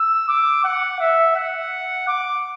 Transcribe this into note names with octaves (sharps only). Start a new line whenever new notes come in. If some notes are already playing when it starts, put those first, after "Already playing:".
Already playing: E6
D6
F#5
E5
F#5
D6